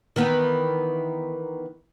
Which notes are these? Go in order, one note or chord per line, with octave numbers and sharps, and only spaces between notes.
D#3 E3 B3